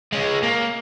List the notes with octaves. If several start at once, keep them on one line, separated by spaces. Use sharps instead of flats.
G#3 C#4
A#3